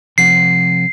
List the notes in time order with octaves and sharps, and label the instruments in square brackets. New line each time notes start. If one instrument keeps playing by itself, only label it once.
[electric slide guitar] C3 F3 F#5 [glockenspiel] C7